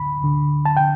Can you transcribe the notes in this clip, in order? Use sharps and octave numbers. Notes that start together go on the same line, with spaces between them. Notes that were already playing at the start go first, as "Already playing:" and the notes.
Already playing: D2 D3 B5
D2 D3
A5
D3 G5